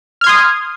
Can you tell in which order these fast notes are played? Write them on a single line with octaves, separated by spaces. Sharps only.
F6 G#6 C6 D#6